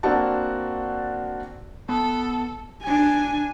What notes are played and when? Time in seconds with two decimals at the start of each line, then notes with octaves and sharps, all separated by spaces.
0.03 A#3 C4 D4 F#4 A5
1.89 B3 A4
2.83 D4 G#5